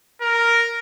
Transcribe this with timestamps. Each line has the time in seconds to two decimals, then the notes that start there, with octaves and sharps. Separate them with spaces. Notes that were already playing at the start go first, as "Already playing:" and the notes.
0.22 A#4